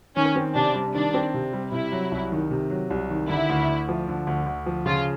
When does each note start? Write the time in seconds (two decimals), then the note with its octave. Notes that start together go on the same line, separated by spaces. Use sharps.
0.16 D#3 C#4
0.36 C4
0.55 C3 D4
0.74 G3
0.94 D#3 D4
1.14 C4
1.34 C3
1.53 G3
1.72 C3 E4
1.92 F#3
2.12 C2
2.32 D#3
2.50 C3
2.70 F#3
2.90 C2
3.10 D#3
3.29 D3 E4
3.49 D2
3.68 D2
3.89 F3
4.08 D3
4.27 D2
4.46 D2
4.66 F3
4.86 C#3 F4